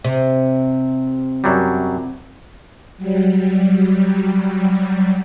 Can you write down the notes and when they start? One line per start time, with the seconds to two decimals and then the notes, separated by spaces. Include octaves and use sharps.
0.04 C3
1.44 F#2 F#3 G3
2.97 F#3 G3